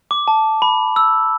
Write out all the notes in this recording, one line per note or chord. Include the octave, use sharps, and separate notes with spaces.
D6
A5
B5
E6